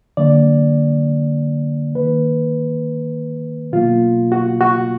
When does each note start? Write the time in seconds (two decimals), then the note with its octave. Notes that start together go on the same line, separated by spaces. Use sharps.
0.17 D3 F#3 A#3 D5
1.95 D#3 A#3 B4
3.72 B2 F#3 A#3 F4
4.32 F#4
4.61 F#4